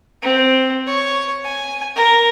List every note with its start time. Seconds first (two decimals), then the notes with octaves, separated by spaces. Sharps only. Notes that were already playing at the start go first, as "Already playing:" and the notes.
0.22 C4
0.87 C#5
1.45 G#5
1.95 A#4